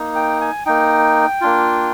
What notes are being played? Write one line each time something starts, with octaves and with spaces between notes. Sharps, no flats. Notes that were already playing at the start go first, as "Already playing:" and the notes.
Already playing: A#3 D#4
G5
G#5
A#3 D#4 G5
A#3 D4 F4